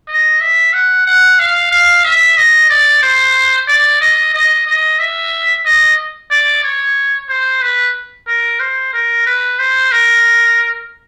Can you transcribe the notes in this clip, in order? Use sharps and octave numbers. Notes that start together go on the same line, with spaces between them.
D#5
E5
F#5
F#5
F5
F5
E5
D#5
D5
C5
D5
D#5
D#5
D#5
E5
D#5
D5
C#5
C5
B4
A#4
C5
A#4
B4
C5
A#4